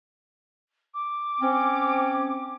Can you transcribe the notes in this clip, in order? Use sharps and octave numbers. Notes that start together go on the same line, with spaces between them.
D6
C4 C#4